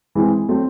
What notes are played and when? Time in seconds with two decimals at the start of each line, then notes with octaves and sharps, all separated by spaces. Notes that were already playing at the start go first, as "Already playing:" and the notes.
0.15 E3 G#3 C4 E4
0.49 F#3 A3 C4